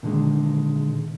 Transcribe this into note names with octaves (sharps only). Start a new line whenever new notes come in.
A#2 D3 D#3 G#3